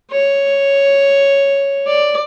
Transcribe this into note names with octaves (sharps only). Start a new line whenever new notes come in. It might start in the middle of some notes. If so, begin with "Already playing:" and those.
C#5
D5